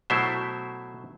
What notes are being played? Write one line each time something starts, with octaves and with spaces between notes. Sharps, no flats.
B2 F#3 A3 E4 C5 E5